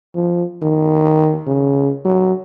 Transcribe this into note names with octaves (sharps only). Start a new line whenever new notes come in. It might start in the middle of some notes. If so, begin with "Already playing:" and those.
F3
D#3
C#3
F#3